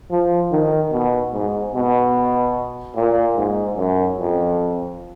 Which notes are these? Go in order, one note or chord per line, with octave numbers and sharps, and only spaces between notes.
F3
D#3
B2
G#2
B2
A#2
G#2
F#2
F2